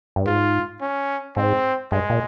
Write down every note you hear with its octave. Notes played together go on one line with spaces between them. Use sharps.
G2
G#2 F4
C#4
G#2 C4
G2 G#3
A#2